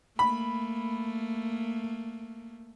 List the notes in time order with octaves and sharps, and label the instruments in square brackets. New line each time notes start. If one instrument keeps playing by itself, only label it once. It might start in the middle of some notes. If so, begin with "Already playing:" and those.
[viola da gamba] A3 A#3 [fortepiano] B5